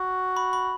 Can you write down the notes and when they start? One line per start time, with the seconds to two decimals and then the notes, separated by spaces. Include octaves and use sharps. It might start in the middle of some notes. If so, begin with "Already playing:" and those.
Already playing: F#4
0.36 B5
0.53 B5